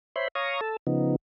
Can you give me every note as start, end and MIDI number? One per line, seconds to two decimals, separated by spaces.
0.16 0.28 72
0.16 0.28 73
0.16 0.28 76
0.16 0.28 83
0.16 0.28 84
0.35 0.61 73
0.35 0.61 77
0.35 0.61 82
0.35 0.61 85
0.35 0.61 87
0.61 0.77 69
0.61 0.77 81
0.87 1.16 49
0.87 1.16 53
0.87 1.16 59
0.87 1.16 63